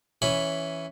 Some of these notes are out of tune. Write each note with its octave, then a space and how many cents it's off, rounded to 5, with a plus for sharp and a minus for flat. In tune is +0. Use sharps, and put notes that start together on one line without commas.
E3 +0 C#4 +0 B5 +0